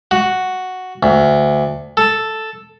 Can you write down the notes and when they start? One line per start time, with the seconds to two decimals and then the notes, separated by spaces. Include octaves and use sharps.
0.11 F#4
1.03 D2
1.97 A4